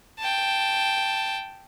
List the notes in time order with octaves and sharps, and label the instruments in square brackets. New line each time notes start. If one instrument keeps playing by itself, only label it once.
[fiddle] G5 A5